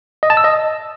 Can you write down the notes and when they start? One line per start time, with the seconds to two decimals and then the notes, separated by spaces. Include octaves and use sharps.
0.23 D#5
0.30 A5
0.37 E6
0.44 D#5